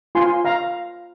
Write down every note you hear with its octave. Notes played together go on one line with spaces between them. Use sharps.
F4 G#5 C6
F5 A#5